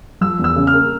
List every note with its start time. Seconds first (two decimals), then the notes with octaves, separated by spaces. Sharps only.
0.21 F3 E6
0.39 E2
0.44 E6
0.56 C#3
0.67 F6
0.74 A#3